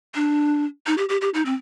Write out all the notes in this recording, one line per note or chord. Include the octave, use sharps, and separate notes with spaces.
D4
D#4
G4
G4
G4
D#4
C4